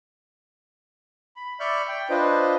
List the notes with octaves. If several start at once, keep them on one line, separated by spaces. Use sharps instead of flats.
B5
D5 E5 B5 C#6 F6 G6
G5
D4 F4 B4 C5 D#5